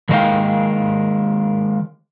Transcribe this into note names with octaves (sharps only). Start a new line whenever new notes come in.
D#3 G#3 A#3 C5 F5 G5